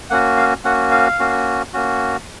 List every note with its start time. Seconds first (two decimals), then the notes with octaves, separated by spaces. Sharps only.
0.10 A#3 C#4 F#4 F#5
0.37 F5
0.64 A#3 C#4 F#4 F#5
0.91 F5
1.19 A#3 C#4 F#4
1.73 A#3 C#4 F#4